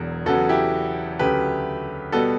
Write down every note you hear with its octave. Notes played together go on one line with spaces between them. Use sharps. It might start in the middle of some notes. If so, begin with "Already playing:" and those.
Already playing: E1 E2 F#3
E2 C#3 F#3 B3 F#4 A4
E4 G4
D2 C#3 F#3 A3 G4 B4
B2 G3 B3 F#4 A4